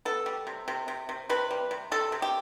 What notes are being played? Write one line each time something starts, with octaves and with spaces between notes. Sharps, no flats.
B3 A4
G3
C3
C3
C3
C3
C3 B4
G3
C3
C3 A4
C3
G4